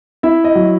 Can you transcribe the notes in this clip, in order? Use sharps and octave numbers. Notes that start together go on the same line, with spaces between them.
E4 E5
D#5
F#3